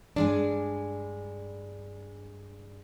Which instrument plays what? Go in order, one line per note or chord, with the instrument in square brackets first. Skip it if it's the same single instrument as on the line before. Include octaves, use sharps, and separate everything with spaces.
[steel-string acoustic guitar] G2 G#3 G#5 [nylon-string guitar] D4